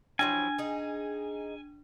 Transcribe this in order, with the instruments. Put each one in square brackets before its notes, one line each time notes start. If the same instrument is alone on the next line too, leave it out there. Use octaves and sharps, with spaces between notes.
[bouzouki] F3 F#3 E4 [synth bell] D4 [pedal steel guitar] G#5
[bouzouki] D#4 G#4